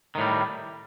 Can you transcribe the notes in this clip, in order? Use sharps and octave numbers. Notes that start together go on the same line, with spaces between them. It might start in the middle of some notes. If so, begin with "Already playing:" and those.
A2 D#3 G3